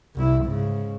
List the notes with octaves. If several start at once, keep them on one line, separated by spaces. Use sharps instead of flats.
C2 E4
G#2 C#3